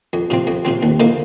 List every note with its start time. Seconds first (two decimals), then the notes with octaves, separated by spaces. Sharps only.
0.13 F2
0.30 C3 F3 C4
0.47 F2
0.65 C3 F3 C4
0.83 D#2
1.00 D3 F3 A#3 D#4